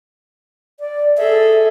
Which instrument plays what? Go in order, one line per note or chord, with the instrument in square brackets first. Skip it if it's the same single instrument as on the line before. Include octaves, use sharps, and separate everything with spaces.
[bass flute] D5
[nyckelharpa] G#4 A4 [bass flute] E5